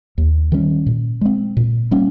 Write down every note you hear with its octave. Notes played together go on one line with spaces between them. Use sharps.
D#2
D#3 G3 C#4
A#2
G#3 C4
A#2
G3 A#3 C#4